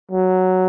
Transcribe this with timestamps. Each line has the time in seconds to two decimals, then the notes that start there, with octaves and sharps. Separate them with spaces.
0.11 F#3